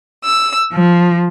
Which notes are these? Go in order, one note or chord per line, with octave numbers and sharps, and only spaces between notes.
E6
F3